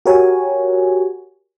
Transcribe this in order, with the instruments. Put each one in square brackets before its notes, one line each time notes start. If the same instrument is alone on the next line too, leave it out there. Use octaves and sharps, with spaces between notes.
[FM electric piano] F#4 G4 A#4 C#5 G#5